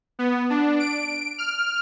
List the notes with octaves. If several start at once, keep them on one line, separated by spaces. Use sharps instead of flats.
B3
D4
D7
F6